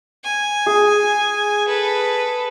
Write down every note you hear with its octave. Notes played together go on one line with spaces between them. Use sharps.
G#5
G#4
A4 B4